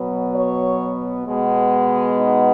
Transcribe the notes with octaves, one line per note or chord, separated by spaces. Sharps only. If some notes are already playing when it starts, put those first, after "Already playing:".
Already playing: B2 F#3 B3
C#5
B2 G#3 B3
D#4